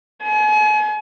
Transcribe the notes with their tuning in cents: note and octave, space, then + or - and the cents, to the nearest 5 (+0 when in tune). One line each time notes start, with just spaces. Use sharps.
G#5 +40